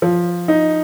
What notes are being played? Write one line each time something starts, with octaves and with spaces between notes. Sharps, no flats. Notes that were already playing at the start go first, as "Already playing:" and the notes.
F3
D#4